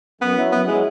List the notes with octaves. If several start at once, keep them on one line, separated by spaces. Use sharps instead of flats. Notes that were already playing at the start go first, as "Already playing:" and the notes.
F#2 B3
F#3 E4
F#2 B3
F#3 G#3 E4